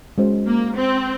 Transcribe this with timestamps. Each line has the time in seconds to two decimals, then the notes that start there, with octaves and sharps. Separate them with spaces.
0.18 G#3 C#4 F#4 C5
0.47 A#3
0.76 C4